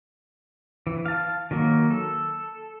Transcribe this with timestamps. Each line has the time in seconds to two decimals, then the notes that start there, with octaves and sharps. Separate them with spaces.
0.87 E3
1.06 F5 A5
1.51 D#3 F#3 A#3
1.90 A4